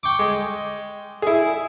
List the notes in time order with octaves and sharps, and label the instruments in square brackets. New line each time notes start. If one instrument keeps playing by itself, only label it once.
[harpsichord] G5 C#6 D6
[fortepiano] G#3
E4 G#4